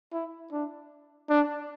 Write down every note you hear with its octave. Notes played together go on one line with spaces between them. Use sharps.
E4
D4
D4